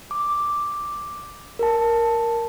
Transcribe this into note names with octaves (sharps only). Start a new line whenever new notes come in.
D6
A#4 A5